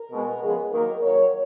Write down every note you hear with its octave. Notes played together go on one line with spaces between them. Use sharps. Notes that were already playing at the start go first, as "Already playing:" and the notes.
Already playing: A#4
B2 G#3 B3
C#3 F3 G#3 B3
D#3 F#3 A#3 A#4
D#3 F#3 A#3 C#5